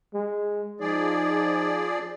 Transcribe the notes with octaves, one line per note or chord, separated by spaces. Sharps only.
G#3
F3 D#4 G#4 D5